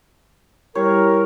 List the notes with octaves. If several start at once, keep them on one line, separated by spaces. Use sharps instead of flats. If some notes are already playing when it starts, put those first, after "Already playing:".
G3 E4 G4 A#4 C#5